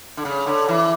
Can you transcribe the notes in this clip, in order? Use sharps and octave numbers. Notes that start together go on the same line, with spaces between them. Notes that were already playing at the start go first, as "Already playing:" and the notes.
D3
C#3
D3
E3